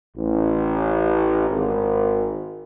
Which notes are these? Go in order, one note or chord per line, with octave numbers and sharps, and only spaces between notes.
A1
G#1